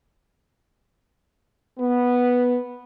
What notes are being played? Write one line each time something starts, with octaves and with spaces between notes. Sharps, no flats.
B3